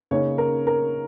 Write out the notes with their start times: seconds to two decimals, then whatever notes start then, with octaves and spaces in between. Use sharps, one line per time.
0.11 C#3 A#3 D#4 C#5
0.38 A#4
0.67 A#4